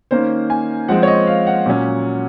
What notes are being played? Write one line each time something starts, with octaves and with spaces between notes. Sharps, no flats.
D#3 A#3 C#4 C5
G#5
F3 G#3 C4 F#5
C#5
D#5
F5
F#5
A#2 F#3 C#4